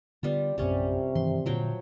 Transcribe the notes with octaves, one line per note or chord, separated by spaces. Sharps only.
D3 G3 B3 F4
A#1 F#2 C3 G3 C#4
G2 D#3 E3 C6
A#2 D3 F3 F#3 G5